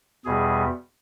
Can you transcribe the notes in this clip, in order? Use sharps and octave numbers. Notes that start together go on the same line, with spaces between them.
E2 B2 G3 G#4